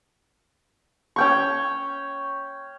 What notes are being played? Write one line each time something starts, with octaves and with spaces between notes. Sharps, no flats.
C#4 G5 C#6